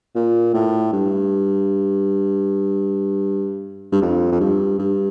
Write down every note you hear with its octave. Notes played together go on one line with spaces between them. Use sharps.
A#2
A2
G2
G2
F2
F2
G2
G2